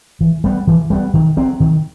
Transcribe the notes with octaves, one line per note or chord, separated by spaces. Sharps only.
E3
G3 B3
E3
G3 B3
D#3
F#3 C4
D#3